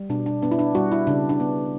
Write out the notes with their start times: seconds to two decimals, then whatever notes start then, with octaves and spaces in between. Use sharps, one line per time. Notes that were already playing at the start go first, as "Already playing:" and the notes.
Already playing: G3
0.10 B2 D4
0.26 D4
0.42 B3 D4
0.51 E4
0.59 D4
0.75 G3 F#4
0.92 E4
1.07 C#3 D4
1.29 D4
1.40 B3